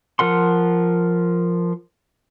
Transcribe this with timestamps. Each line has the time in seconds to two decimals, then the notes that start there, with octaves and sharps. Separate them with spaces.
0.19 F3 A#4 F#5 C6